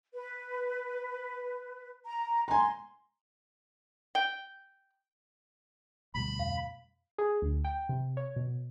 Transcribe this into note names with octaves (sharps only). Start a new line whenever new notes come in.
B4
A#5
G#5 A#5 C6
G5
D2 B2 G3 B5
F2 F5
G#4
D2
G5
C3
C#5
B2